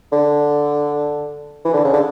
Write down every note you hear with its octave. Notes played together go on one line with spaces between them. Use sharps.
D3
E3
D3
C#3
D3